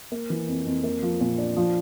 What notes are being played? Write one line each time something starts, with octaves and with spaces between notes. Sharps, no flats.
A#3
E3
F2
F2
A#3
F3
A#2
D4
F3